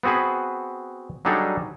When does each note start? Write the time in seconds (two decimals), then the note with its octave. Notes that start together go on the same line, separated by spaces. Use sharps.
0.03 B3 C4 F#4 G#4 B4
1.25 F#3 G3 D4 D#4 G#4 A4